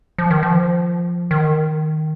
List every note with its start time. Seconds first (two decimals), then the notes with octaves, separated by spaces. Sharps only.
0.18 F3
0.30 D#3
0.43 F3
1.31 D#3